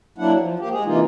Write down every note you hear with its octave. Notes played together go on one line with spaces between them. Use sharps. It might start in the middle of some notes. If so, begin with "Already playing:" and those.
F#3 A#3 D4 E4 F#5
F3
A#3 G4
G#3 G#4
C3 E3 A#3 D#4 F4